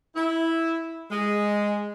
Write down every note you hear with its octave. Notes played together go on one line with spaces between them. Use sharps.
E4
G#3